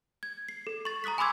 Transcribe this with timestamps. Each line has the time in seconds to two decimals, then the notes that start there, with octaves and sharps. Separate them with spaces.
0.23 G#6
0.49 C7
0.67 A4
0.85 C#6 A6
1.04 A#5 C#6 D#6 F#6 B6
1.18 G#5 B5 C6 D6 E6 G#6